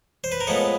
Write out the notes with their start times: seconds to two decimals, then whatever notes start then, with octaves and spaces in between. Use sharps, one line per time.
0.24 C5
0.32 B4
0.40 A#4
0.47 A2 F3 G#3 B3 A4